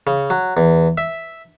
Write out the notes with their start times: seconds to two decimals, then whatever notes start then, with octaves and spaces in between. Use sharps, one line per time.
0.07 C#3
0.30 F#3
0.57 E2
0.98 E5